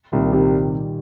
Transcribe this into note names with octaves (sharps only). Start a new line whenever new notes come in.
C2 A#2 D#3
C3 D#3 G3